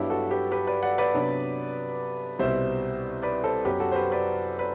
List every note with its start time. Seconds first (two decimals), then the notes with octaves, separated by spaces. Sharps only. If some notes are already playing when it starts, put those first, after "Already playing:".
Already playing: G2 F#3 B3 D4 E4 G4
0.10 F#4 A4
0.31 G4 B4
0.51 G4 B4
0.67 B4 D5
0.83 D5 F#5
0.98 B4 D5
1.14 C3 F#3 B3 D4
2.39 C2 B2 G3 C5 E5
3.23 B4 D5
3.44 A4 C5
3.65 F#2 F#3 B3 G4 B4
3.80 F#4 A4
3.92 C5
3.96 G4 B4
4.12 B4 D5
4.59 B4 D5